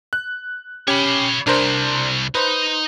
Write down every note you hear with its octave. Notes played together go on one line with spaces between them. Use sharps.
F#6
C#4 G4 C#5 B5
C2 D4 A#4 C5
D#4 B4 C5